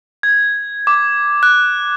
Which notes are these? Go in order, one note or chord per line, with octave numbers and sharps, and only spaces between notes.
G#6
D6
F#6